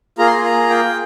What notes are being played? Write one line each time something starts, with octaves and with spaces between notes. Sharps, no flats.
A#3 F4 G#4 A#5
C6
A#5
A#5
G5